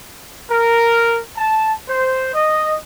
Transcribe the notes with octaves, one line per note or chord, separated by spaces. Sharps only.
A#4
A5
C5
D#5